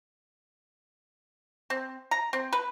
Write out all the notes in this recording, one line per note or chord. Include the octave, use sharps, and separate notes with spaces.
C4
A#5
C4
B4